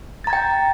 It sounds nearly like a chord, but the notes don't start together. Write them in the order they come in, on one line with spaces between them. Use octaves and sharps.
A6 A#5 G#6 G5